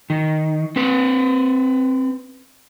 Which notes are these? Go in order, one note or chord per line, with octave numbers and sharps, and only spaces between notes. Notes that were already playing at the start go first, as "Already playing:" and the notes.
D#3
C4 B4